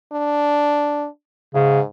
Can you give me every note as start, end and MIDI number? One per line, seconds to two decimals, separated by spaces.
0.13 1.07 62
1.55 1.85 44
1.55 1.81 49